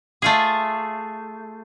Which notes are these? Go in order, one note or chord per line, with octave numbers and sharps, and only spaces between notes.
A3 F4 G#4